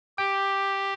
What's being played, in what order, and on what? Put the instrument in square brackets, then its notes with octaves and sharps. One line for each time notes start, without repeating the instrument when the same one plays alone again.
[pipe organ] G4 [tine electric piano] G5